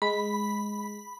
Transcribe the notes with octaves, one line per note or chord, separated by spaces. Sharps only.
G#3 B5